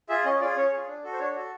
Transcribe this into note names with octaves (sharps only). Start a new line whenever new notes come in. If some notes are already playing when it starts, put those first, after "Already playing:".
F4 G#4 E5
C#4 D#5
F4 G#4 D5
C#4 C#5
F4 G#4
D4
F#4 A4
C5
D4 C#5
F#4 A4